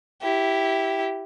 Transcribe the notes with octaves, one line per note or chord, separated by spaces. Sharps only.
E4 G4